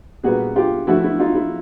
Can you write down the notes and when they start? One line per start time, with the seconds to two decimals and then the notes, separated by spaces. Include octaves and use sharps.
0.23 A#2 G3 B3 F#4 G#4
0.56 F4 G4
0.87 D3 F3 A3 E4 F#4
1.04 E4
1.19 D#4 F4
1.35 E4